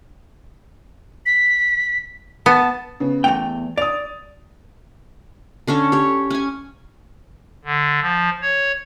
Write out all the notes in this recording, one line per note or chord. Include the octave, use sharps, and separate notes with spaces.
B6
B3 A5
C#3 B3
E2 A3 G5 F7
D5 D#6 F7
D3 C#4 A4 C#5
G4 C#5
C#4 G#5
D3
F3
C#5